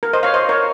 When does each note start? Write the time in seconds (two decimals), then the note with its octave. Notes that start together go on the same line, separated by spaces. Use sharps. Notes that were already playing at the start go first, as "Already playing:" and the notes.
0.03 A#4
0.13 C5 D#5
0.23 C#5 F5
0.34 C5 D#5
0.49 A#4 C#5